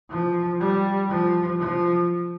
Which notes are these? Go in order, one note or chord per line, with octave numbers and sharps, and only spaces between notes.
F3
G3
F3
F3